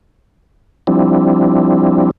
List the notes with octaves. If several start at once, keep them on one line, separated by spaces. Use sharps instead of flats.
F3 G3 C4 D4 E4